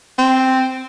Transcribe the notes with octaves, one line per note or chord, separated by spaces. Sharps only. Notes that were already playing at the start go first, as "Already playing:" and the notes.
C4